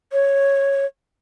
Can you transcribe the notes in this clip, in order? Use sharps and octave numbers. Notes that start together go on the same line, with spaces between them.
C#5